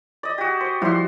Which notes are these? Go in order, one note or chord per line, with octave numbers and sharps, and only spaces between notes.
D5 D#5
F#4 G4
C5
F3 G3 E4 F#4 C6